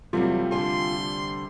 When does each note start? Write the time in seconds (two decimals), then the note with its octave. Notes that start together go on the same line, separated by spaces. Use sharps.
0.13 E2 C3 F#3 G3 A3 C4 F4
0.52 D3 G#5 C6